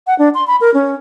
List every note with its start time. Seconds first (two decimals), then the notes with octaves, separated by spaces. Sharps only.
0.07 F#5
0.19 D4
0.34 C6
0.47 B5
0.61 A#4
0.74 C#4